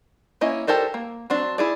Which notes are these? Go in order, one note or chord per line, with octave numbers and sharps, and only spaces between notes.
A#3 C#4 E4 D#5
G4 A4 A#4 C5 D5
A#3
F#3 C4 D4
E4 G#4 D5